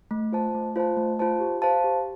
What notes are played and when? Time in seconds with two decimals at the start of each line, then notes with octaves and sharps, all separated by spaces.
0.11 A3
0.32 F4 C5 A5
0.54 A3
0.76 F4 C5 A5
0.97 A3
1.19 F4 C5 A5
1.40 G4
1.62 C5 F5 A5
1.84 G4